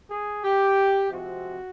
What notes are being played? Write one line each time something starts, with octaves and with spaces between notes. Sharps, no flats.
G#4
G4
C3 F3 G#3 C4 F#4